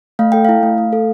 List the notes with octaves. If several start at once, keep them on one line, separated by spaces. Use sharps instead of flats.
A3 F5
A4 G5
E4 F5
A3
A3
A4